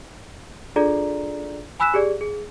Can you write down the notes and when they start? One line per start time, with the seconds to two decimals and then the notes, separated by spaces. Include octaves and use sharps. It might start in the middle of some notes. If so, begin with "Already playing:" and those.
0.76 D4 F4 G#4 A4 D5 A#5
1.80 G#5 B5 E6 F#6 B6 E7
1.94 G4 G#4 D5
2.21 G#4